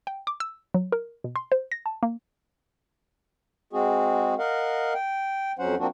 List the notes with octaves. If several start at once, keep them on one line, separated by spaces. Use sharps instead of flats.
G5
D6
E6
F#3
A#4
B2
C6
C5
A#6
A5
A#3
G#3 C4 F#4 G#4
A#4 D#5 F5 F#5
G5
F2 F#3 C#4 C5 F#5
F3 A#3 C4 D4 F#4